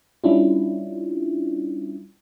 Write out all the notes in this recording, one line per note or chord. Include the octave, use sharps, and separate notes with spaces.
G3 C#4 D4 E4 F4